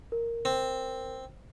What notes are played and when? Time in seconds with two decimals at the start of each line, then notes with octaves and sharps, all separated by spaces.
0.12 A#4
0.45 C4